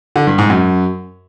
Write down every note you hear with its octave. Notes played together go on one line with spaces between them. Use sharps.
D3
G2
G#2
F#2